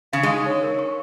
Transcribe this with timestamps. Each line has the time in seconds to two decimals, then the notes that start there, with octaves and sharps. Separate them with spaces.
0.13 C#3 F5
0.23 G#3
0.29 D#4
0.46 C#5
0.63 A#4
0.79 C#6